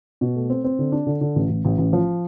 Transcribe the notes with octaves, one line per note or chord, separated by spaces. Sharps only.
B2
A3
C4
C4
D3
D4
D3
D3
A1
A1
A1
A1
F3